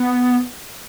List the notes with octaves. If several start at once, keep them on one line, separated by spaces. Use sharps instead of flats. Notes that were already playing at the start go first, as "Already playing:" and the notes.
Already playing: B3